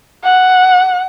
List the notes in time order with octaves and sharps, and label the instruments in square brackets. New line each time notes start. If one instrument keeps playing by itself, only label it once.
[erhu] F#5